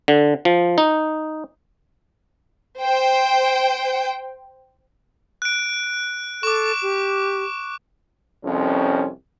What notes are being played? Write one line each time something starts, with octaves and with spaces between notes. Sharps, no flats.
D3
F3
D#4
C5 G5
F#6 D7
A4 C#6 D6
G4
C2 F2 C#4